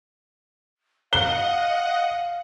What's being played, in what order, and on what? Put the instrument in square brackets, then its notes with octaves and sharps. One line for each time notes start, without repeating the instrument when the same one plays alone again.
[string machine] D#5 F#5 [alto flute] F5 [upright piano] G7